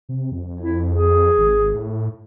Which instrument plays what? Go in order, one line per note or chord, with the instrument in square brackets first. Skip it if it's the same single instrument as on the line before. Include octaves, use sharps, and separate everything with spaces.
[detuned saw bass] C3
F2
[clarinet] E4
G#4
[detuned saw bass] G#1
A2